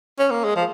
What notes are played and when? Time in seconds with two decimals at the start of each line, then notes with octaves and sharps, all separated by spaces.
0.19 C#4
0.31 A#3
0.44 G#3
0.56 F3